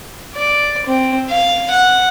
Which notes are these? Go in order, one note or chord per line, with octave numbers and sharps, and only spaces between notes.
D5
C4
F5
F#5